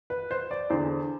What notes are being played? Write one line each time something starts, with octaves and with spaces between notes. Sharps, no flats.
B4
C5
D5
E2 D3 C5